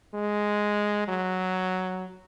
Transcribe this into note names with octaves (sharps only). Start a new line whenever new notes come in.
G#3
F#3